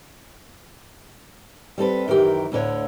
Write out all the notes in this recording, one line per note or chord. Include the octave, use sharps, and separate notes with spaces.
G3 C4 A4 B4
F#2 D#3 E3 G4 A#5
D2 A2 D3 C#5